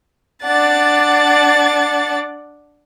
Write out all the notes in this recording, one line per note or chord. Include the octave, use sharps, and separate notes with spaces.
D4 D5 F#5 A6